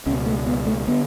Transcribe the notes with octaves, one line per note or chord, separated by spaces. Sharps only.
C#2 B2 C#4
A3
B3
A3
D3 B3